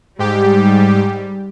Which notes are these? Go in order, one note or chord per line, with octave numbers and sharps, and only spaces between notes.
G#2 G3 G4